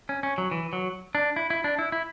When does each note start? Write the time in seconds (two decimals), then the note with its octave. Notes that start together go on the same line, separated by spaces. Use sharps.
0.09 C#4
0.23 C#4
0.38 F#3
0.51 E3
0.73 F#3
1.15 D4
1.36 E4
1.50 E4
1.64 D4
1.79 E4
1.92 E4